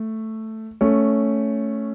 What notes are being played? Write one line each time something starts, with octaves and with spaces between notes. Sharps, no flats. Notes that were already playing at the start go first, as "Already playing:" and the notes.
Already playing: A3
A3 C#4